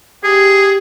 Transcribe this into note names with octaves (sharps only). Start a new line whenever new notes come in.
G4 G#4